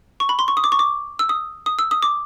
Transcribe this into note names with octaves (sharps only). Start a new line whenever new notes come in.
C#6
B5
C6
C#6
D#6
D6
C#6
D6
E6
D#6
D#6
E6
D#6
D6